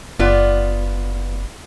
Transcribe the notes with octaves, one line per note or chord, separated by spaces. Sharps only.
F#1 B3 F4 D5